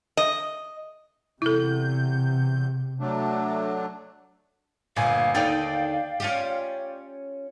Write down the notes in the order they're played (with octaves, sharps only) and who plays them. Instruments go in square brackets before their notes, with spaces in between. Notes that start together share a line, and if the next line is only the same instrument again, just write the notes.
[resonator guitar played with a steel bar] D#5
[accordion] E2 G6 [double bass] C3 [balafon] E4 A4
[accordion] F#3 A3 D4
[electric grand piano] G1 G#5 [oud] A#2 [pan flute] F5
[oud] D#2 D3 D#4 [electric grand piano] D5 G5 A6 [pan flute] F5
[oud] C#4 F4 G4